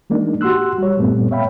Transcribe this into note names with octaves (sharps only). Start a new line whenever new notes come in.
E3 G#3 A#3 D4 D#4
F#4 G4 C6 E6 F#6
G3 C#5
G2 A#2 G3 A3 B3 C4
C#5 E5 F5 G5 B5